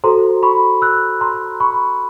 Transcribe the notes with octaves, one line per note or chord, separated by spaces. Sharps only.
F#4 A4 C5 A#5 C6
B5 C#6
E6 F#6
A#5 C6
B5 C#6